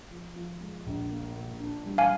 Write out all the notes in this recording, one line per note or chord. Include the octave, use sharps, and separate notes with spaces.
F3
F3
G#3
A#1
A#3
A#2
D4
G3
F5 G#5